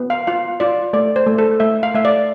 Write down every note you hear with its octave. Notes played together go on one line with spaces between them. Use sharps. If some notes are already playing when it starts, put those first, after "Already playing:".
Already playing: B3
F5
F4 F5
F4 D5
A3 D5
C5
A3
A4
A3 E5
F5
A3 E5
D5